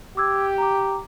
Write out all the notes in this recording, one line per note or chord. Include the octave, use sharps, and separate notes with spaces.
G4 D6 E6 G#6
A#5 D6